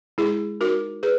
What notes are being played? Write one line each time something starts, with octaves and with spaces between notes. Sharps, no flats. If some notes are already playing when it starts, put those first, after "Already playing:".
G#3 E4 G#4
D#4 F#4 A#4
G#4 B4